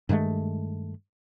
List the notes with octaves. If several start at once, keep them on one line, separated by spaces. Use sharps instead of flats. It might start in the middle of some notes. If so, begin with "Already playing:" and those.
G2 D#3 G#3 A3